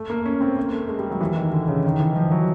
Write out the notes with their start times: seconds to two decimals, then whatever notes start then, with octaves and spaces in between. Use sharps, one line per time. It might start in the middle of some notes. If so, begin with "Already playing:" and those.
Already playing: A3
0.10 A#3
0.26 C#4
0.40 C4
0.57 A#3
0.73 A3
0.88 G#3
0.99 G3
1.10 F#3
1.21 E3
1.36 D#3
1.52 D3
1.68 C#3
1.85 D#3
2.00 E3
2.16 F3
2.31 F#3